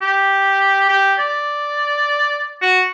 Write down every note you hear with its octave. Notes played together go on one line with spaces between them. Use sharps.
G4
G4
D5
F#4